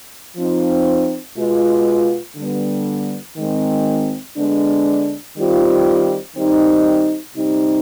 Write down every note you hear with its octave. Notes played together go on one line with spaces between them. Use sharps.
F3 C4 D#4
B2 G#3 B3 F4
D3 G3 B3
D#3 G#3 C4
D3 G#3 B3 D4
D#3 G3 C4 F4
D#3 G3 C4 D#4
C3 G3 C4 D#4